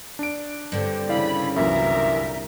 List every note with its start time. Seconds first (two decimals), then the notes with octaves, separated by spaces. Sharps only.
0.19 D4 D7
0.72 G2 D3 C4
1.09 C#3 E4 D5 F5 B5
1.56 C2 F#2 A#2 E3 A#4 E5